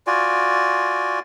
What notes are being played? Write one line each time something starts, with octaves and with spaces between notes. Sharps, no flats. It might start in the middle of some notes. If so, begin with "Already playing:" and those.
F4 F#4 D5 G#5